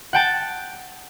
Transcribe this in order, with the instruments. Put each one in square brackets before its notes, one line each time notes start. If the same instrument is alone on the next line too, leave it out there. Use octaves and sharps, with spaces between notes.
[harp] F#5 G5 A5